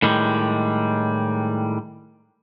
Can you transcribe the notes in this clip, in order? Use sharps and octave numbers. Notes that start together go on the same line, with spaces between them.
A2 D#3 G3 G#3